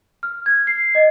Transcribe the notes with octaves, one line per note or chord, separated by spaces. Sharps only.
F6
G#6
C7
D#5